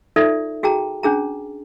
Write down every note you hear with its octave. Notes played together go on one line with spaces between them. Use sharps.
D#4 F4 A4 D5 E5
F#4 G#4 G5 A5 A#5
C#4 D4 G#4 A#5